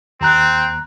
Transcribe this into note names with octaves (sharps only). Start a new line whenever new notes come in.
D#2 C4 A#5 F#6